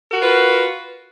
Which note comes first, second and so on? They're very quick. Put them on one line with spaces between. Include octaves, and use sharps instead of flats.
A#4 F#4 B4 F4